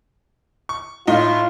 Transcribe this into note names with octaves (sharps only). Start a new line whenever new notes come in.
C#6
A2 D#4 F4